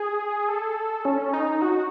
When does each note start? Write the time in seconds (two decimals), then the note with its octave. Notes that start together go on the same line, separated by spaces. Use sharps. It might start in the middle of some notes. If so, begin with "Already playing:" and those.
Already playing: G#4
0.48 A4
1.05 C#4
1.33 D#4
1.62 F#4